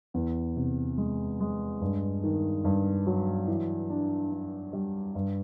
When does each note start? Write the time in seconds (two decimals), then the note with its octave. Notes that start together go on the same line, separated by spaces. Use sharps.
0.14 E2
0.56 C3
0.98 G#3
1.40 G#3
1.81 G2
2.24 D#3
2.65 G2
3.07 F#3
3.48 E3
3.90 D4
4.31 D4
4.73 G3
5.15 G2